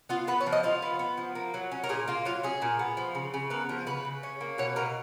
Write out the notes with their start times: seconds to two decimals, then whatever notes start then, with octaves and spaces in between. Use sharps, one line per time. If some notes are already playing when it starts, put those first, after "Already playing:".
0.09 B3 F4
0.27 B3 B4
0.40 C#5
0.46 F3
0.52 D#5
0.63 F3 F4
0.82 B3
0.99 B3
1.17 F3
1.35 A#3
1.54 F#3
1.72 C#4
1.84 A#4
1.89 A#2 G#4
2.08 A#3 F4
2.25 F#3 F4
2.43 C#4 G#4
2.62 A#2
2.79 B3
2.97 F3
3.15 C#3
3.34 C#3
3.50 B3 A#4
3.69 F3
3.86 C#3 B4
4.05 C#3
4.23 C#4
4.41 A#3
4.58 B2 C#5
4.76 B2 A#4